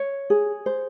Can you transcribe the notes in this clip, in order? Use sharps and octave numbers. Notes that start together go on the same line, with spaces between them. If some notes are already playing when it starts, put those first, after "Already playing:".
Already playing: C#5
G#4
C5